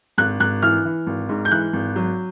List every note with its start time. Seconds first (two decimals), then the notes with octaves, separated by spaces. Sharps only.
0.18 G#1 F#6
0.40 G#1 F#6
0.62 E3 F6
0.85 E3
1.07 G#1
1.29 G#2
1.45 G6
1.51 E3 F#6
1.73 G#1
1.96 F#3